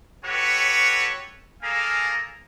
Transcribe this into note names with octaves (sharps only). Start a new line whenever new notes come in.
F#4 G4 A4 B4 C#5
A#3 G#4 A4 F5 G#5 A#5